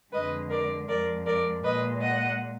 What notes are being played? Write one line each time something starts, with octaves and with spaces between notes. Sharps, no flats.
F2 D3 G#3 B4 D#5
A#4 D5
F2 F3 G#3 A#4 D5
A#4 D5
A#2 G#3 B4 D#5
D#5 F#5